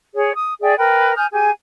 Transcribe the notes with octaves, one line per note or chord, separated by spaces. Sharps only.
G#4 C#5
D#6
G#4 D5 E5 G5
A#4 B4 G5
G#5 D#6 F6 G6
G4 G#4 G#5